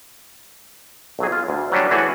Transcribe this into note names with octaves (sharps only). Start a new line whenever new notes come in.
B1 F#3 G#4
F4
D2
F#3 G3 C#4 D4
E3 A3 F#4 G#4 F#5 G#5